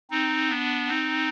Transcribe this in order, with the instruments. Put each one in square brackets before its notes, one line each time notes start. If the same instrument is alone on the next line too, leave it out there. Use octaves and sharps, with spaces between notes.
[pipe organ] C4 D#4
B3 D4
C4 D#4